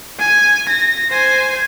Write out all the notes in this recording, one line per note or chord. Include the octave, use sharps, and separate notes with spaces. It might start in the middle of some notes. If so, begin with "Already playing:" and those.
G#5
A#6
C5 G#5